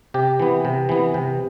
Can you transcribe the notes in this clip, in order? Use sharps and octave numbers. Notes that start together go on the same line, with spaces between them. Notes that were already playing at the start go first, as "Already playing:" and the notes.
C3 G4
E3 B3
C3
E3 B3
C3